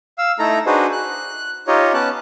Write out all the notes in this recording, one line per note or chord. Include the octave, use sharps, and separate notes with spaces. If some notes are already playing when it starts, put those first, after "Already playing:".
F5 E6
A3 D#4 E4 A4 A#5
D4 D#4 F#4 G#4 B4 C5
F#6
D#4 F4 G4 C#5 D#5
B3 C#4 A5 F#6